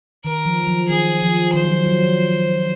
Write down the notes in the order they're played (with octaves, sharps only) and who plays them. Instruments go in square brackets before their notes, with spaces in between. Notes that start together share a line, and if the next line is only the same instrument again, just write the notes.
[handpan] D#3 [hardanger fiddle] A#4
[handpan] F3
F#3
F3
[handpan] D#3 [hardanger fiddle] G#4
[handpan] F3
[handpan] D#3 [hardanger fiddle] C5
[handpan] F#3
F3
F#3
F3